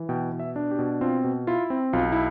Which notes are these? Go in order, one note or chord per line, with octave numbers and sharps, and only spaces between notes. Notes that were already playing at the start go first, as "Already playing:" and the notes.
Already playing: E3
B2 G5
B2
E5
D4
G4
B2
C4 F4
B2
E4 F4
C4
B1 F4
E4